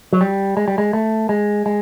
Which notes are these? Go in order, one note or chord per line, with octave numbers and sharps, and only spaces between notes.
F#3
G3
G#3
G3
G#3
A3
G#3
G#3